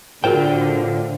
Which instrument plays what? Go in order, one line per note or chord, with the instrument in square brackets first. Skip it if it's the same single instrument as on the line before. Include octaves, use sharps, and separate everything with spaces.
[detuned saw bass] A2 [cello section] D3 [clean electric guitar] F4 C5 G5 [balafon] F#4 G#4 A#4